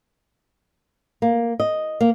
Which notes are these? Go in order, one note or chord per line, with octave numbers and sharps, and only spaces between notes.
A#3
D#5
A#3